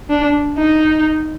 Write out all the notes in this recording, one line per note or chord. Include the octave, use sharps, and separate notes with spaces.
D4
D#4